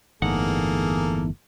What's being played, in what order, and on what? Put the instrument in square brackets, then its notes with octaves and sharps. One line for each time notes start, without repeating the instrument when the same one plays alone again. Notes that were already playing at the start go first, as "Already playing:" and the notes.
[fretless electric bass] G1 A2 [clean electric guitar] E2 D#4 F#5 [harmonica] A#3 G#4 A4